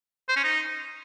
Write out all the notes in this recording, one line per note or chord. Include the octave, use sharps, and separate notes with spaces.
C5
C#4
D#4